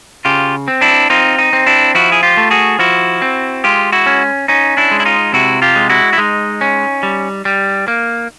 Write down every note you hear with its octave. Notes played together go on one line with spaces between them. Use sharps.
C#3 F4 G4
C4
D4 E4
C4 D#4 F4
D#4
C4
D4 E4
F3 E4 F#4
G#4
F4 G4
A3
F#4 G#4
F3 E4 F#4
C4
G#3 F4 G4
E4 F#4
C#4
C#4 D#4
D4 E4
G#3
E4
D#4 F4
C3 E4 F#4
F4 G4
G#3
E4 F#4
E4
G#3 D#4
C#4
G3
G3
A#3